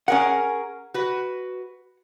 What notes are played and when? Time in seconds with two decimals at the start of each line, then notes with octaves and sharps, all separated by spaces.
0.08 C#4 G#4 A#4 F#5
0.94 F#4 B4